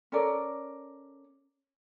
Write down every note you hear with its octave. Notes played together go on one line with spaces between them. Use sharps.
C#4 A4 A#4 D5